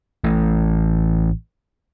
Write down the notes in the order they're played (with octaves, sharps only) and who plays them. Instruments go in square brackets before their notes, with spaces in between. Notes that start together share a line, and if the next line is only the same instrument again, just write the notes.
[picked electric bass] A1 A2